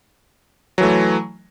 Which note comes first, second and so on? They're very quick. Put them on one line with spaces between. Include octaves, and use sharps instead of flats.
F#3 E3 A3